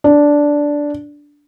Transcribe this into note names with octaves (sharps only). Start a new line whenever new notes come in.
D4